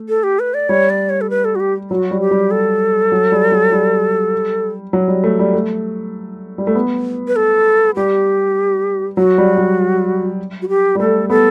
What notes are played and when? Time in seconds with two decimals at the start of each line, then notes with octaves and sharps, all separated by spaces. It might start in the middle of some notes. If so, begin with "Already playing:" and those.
Already playing: A3
0.09 A4
0.23 G4
0.39 B4
0.54 D5
0.69 G3 C#5
0.90 D5
1.10 C#5
1.21 A4
1.30 B4
1.45 A4
1.55 F#4
1.60 G4
1.90 F#3 F#4
2.11 G3
2.21 G4
2.31 G3
2.51 A4
3.12 F#3
3.32 G3
3.52 F#3
3.72 G3
4.93 F#3
5.08 G3
5.24 A3
5.39 G3
5.54 A3
6.58 G3
6.67 A3
6.75 B3
7.28 B4
7.36 A4
7.96 G3 G4
9.17 F#3 F#4
9.38 G3
9.58 F#3
10.62 F#4
10.69 G4
10.95 G3
10.99 A3 A4
11.30 B3 A4